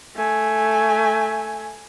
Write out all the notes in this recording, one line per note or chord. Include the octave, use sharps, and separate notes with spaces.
A3 G#5